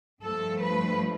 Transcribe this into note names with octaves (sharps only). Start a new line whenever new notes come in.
G2 F3 A3 A4
B4